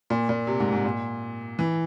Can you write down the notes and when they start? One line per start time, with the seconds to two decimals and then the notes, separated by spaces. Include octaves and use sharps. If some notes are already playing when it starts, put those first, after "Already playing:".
0.10 A#2
0.29 A#2
0.47 C3
0.60 G#2
0.73 G#2
0.84 A#2
1.59 E3